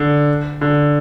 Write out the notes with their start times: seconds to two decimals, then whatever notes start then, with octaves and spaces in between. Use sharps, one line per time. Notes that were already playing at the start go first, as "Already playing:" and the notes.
Already playing: D3
0.61 D3